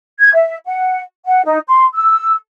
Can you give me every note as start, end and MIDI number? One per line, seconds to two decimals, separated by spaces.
0.20 0.32 92
0.34 0.56 76
0.66 1.02 78
1.26 1.42 78
1.45 1.59 63
1.68 1.85 84
1.95 2.34 88